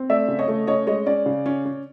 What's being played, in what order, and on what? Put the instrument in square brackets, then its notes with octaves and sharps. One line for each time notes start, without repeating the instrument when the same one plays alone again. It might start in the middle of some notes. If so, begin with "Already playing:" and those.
Already playing: [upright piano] C4
A3 D5 E5
C#3
C#5 D#5
A3
C#4 C#5 D#5
G#3 C#5 D#5
C#4 D5
C#3
C#4
C#4